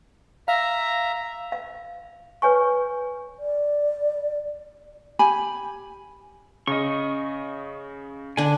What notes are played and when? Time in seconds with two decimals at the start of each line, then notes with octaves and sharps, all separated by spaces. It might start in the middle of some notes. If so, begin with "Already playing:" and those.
0.48 E5 F5 A#5
1.52 F5
2.42 B4 C#5 G#5 C#6
3.39 D5
5.19 G4 G#5 B5
6.67 C#3 D#5 C#6
8.37 D3 D4 G#5